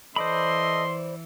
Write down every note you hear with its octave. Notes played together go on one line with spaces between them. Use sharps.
E3 A4 C5 D5 D#5 B5 C6